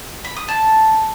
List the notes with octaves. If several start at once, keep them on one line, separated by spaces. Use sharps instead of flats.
B5
D#6
A5